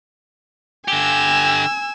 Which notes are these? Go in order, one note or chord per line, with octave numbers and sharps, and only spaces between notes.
D3 G4 G#5 E6